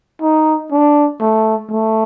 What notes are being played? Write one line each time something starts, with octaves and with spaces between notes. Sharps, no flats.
D#4
D4
A3
A3